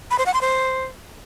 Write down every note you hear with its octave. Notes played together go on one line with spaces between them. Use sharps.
B5
C5
F#5
C6
C5